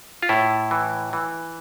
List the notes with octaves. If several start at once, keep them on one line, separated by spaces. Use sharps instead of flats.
F4
A2 E4
E3
E3